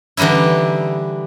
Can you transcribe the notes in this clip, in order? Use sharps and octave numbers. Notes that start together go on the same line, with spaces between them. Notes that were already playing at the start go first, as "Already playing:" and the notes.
D3 E3 G3 D#4 E4